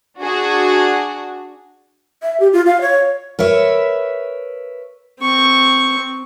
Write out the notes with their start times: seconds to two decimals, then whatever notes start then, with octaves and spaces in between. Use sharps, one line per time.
0.19 D4 F#4 G#4
2.23 E5
2.40 G4
2.53 F4
2.66 F5
2.81 C#5
3.39 A#4 B4 C#5 E5
5.20 C4 C#6